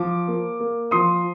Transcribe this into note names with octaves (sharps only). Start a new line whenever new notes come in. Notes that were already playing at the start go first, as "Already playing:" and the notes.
Already playing: F3 D6
A#3
A#3
F3 C6 D#6